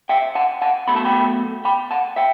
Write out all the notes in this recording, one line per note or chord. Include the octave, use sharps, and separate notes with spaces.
E5 G5
F#5 A5
F#5 A5
B1 B2 A3 B5
A5
G5 B5
G5 B5
F#5 A5
E5 G5